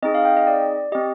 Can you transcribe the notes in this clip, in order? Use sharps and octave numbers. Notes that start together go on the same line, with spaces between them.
C4 D#4 G#4 D#5
F5
G5
D#5
D5
C4 G4 D#5